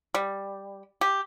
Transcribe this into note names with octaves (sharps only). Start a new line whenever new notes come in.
G3
G4